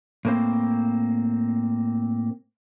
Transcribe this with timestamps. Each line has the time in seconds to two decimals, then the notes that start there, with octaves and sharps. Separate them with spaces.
0.25 A2 A#3 C4